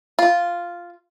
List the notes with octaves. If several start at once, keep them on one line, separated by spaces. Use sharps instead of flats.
F4